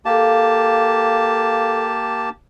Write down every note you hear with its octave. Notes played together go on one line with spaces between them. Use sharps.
A#3 G4 A4 F5 A5